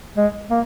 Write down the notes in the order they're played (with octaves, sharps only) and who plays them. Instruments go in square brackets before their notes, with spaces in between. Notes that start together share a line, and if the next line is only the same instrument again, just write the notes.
[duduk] G#3
A#3